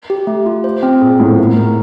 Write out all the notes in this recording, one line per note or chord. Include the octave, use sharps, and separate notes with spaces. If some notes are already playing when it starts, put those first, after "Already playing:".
G4
A3
F4
C5
C4
A#2 G#4
A2 B3
A2 A#4
A#4